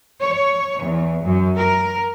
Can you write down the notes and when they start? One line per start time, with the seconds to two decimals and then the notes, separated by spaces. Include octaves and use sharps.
0.22 C#5
0.80 E2
1.24 F#2
1.58 A#4